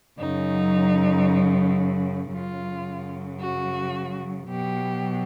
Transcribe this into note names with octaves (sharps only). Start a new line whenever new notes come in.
F#2 C#3 F#3 D#4
F#2 C#3 F#3 F4
F#4
B2 F#3 G4